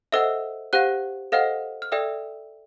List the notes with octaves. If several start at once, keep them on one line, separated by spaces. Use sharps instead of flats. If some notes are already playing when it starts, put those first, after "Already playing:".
A4 C5 D#5 E5 F#5 E6
G4 C5 F5 F#5 F#6
A4 C5 D#5 F5 F#5 F6
F6
A4 D5 E5 G5 E6